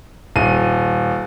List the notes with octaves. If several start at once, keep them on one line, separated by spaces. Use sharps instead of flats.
D#1 D#7